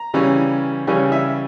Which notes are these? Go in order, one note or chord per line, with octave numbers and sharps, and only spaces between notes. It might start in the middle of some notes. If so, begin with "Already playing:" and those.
Already playing: A#5
C#3 E3 G3 C#4
C#3 E3 G3 C#4 G#5
E5